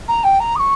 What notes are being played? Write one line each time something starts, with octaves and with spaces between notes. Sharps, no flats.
A#5
G5
A#5
D#6
C#6